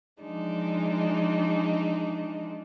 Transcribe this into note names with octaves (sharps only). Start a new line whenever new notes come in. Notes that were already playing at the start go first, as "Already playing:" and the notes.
E3 F3 G#3 D4 D#4